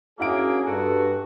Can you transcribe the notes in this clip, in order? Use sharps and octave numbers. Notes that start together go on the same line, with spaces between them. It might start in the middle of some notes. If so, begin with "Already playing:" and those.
A#3 C#4 D4 E4 F#4 G#4 F#5 D7
G2 F#4 A4